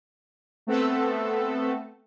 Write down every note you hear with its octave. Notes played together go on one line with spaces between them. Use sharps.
A3 B3 C4 A4